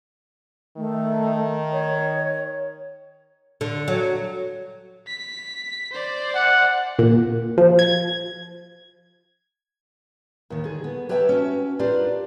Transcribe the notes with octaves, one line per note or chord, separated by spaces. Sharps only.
D#3 A3
C#5
D3
F#3
B6
C5 D5
F#5
A#2
F3
G#6
D#2 D#3
D3 G#4
B3
G4 B4 C#5 E5 G5 A5
C#4 F#4
D4 F4 G4 A#4 B4 D5